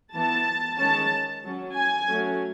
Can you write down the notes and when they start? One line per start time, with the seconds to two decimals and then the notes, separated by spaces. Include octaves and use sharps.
0.13 E3 B3 A5
0.78 D#3 G#3 C#4 A5
1.44 F#3 C#4
1.76 G#5
2.09 F#3 A3 C#4